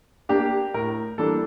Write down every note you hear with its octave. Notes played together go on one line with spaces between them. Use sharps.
A#3 D4 G4
A2 A#4
E3 G3 A#3 D4 A4